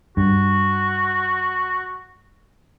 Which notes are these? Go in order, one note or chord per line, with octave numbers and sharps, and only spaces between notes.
G2 F#4